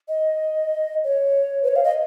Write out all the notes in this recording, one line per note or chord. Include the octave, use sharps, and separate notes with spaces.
D#5
C#5
B4
C#5
F5
D#5